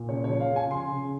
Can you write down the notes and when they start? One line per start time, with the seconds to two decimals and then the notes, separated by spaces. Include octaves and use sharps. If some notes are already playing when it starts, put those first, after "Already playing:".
Already playing: A#2
0.09 C#3 C#5
0.24 C#5
0.29 F3
0.40 F5
0.51 C#3
0.56 G#5
0.71 C#3 C6
0.91 C#3